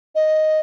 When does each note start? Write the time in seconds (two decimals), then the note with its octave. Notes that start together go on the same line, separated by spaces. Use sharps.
0.15 D#5